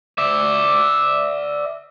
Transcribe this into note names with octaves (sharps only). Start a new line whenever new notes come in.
D5 E5